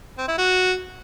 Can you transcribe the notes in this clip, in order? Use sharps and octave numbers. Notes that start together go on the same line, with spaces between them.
C4
E4
F#4